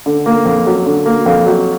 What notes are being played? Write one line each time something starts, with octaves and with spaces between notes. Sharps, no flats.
D3
A#3
F2
F#3
D3
A#3
F2
F#3